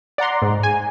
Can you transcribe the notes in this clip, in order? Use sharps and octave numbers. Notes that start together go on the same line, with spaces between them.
D5 F#5 A#5 C6
G#2
G#5